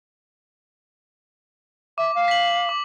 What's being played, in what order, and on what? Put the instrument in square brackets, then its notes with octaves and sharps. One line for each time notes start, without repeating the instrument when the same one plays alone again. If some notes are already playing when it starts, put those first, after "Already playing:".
[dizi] E5 [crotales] D6
[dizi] F5
[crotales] B6 F#7
D6